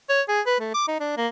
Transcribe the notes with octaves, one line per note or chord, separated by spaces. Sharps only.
C#5
G#4
B4
A3
D6
D#4
D4
A#3